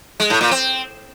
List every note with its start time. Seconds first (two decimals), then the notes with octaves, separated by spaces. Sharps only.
0.20 G#3
0.30 A2
0.41 A#2
0.51 C4